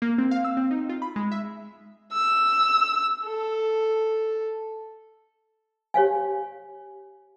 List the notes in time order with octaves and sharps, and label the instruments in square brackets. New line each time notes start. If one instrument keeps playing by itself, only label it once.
[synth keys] A#3
C4
F5
E6
C4
D#4
F4
B5
G#3
E5
[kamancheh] E6
A4
[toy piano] G4 C#5 F5 G#5